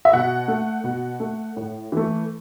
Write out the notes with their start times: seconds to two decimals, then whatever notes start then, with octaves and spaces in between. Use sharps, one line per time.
0.05 E5
0.13 B2 F#5
0.48 A3
0.84 B2
1.20 A3
1.56 A2
1.92 E3 A3